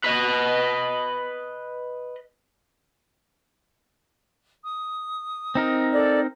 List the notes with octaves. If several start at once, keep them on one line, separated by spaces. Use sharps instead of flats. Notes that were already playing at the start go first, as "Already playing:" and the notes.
B4 D#5
D#6
C4 D#4 A#4
A4 D5